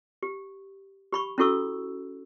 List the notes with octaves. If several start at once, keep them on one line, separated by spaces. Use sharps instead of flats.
G4
G4 B5 C#6
C#4 E4 F#4 A4 C#6 E6